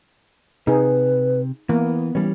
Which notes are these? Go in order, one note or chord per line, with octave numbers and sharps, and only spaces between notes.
C3 D#4 G#4 B4
E3 A#3 B3
E3 G3 C#4